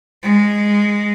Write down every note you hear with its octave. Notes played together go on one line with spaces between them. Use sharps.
G#3